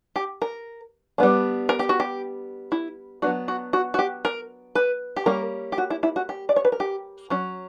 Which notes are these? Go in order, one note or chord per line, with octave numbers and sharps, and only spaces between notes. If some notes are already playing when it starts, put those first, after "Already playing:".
G4
A#4
G3 B3 D4
A#4
G4
F#4
G4
E4
F#3 B3 D4 F#4
F#4
F#4
F#4
G4
A#4
B4
G4
G3 A#3 C#4 A#4
G4
F#4
E4
E4
F#4
G4
D5
C#5
B4
A#4
G4
F#3 C#4